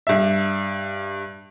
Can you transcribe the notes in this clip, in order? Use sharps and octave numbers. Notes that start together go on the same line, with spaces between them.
G2 E5